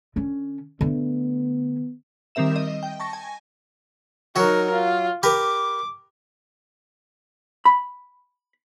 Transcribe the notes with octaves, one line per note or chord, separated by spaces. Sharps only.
D3 C#4
D3 A3 B3
D#3 G3 C4 A#4 E5 E7
D#5
G5
A5 C#6 A#6
G#5
F#3 D#4 F#4 A#4
F4
G4 A#4 B4 D6
B5